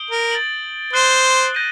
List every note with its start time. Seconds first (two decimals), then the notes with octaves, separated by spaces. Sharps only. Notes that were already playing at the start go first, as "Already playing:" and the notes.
Already playing: D#6 G6 D7 G7
0.11 A#4
0.31 A6 D7 F#7
0.93 C5 D#6 F#6 C7 G7
1.55 G6 A#6 D#7